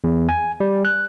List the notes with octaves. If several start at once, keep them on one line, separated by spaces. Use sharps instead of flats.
E2
G#5
G3
F#6